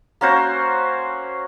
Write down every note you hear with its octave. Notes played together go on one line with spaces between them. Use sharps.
A#3 C#4 F#4 C5